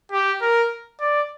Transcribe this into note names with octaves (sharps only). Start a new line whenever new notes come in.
G4
A#4
D5